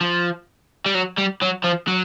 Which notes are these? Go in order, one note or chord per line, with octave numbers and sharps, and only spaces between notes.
F3
G3
F#3
G3
F#3
F3
F#3